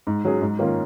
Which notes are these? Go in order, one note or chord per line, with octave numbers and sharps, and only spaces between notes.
G#2
F#3 C#4 G#4
G#2
D#3 A#3 C#4 F4